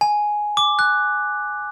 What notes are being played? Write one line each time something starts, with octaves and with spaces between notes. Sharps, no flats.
G#5
D6
F#6